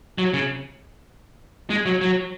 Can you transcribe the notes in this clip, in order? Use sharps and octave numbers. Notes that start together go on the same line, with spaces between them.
F#3
C#3
G#3
F#3
F#3